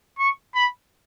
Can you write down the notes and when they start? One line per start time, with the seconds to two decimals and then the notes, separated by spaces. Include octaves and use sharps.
0.19 C#6
0.55 B5